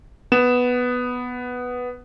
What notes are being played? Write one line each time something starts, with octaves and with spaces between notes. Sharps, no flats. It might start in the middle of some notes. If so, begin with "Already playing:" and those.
B3 E7